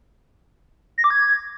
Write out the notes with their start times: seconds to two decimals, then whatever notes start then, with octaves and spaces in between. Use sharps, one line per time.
0.98 A#6
1.04 D6
1.10 G#6